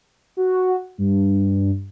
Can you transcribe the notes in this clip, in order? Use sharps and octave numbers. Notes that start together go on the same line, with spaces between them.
F#4
G2